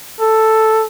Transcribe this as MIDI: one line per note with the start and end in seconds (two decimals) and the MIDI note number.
0.21 0.85 69